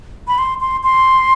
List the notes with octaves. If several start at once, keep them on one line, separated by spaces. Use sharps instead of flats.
B5
C6
C6
C6